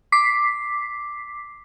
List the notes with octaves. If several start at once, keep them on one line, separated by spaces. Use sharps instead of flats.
D6 B6 C7